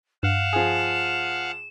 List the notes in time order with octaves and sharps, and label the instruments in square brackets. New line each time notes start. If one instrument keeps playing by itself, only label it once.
[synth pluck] G2 [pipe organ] F5 F#5 [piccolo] E7
[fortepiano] F3 G#4